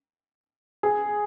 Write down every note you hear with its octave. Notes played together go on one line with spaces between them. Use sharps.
G#4